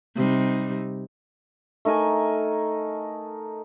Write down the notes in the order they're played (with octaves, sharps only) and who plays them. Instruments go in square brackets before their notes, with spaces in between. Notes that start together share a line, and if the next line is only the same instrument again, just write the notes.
[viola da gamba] C3 G3 D#4
[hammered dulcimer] A3 D#4 A#4 G#5